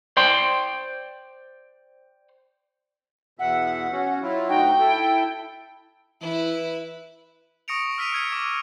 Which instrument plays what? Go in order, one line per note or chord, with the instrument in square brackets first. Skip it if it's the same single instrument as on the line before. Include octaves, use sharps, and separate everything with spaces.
[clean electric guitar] C5 D5 G5 C6
[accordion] E2 B2 E5 [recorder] F#5
[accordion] C#4 F#4
F#3 E4 F4
[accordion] D2 D#4 F#4 [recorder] G5
[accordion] E4 A4
[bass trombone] E3 [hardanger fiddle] E4 B4
[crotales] C#6 D#6 A#6 C#7 D7 F7
E6 F6 B6 D7 D#7 F7
F6 G#6 C#7
D6